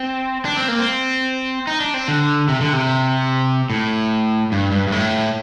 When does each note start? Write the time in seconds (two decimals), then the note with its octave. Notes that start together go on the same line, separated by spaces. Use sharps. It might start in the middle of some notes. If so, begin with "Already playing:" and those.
Already playing: C4
0.45 D4
0.57 C4
0.68 A#3
0.79 C4
1.67 D#4
1.80 D4
1.94 C4
2.08 D3
2.48 C3
2.61 D3
2.73 C3
3.70 A2
4.52 G2
4.72 G2
4.88 G2
4.92 A2